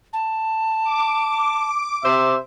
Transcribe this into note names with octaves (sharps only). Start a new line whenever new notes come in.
A5
D6
C3 C5 E5 D6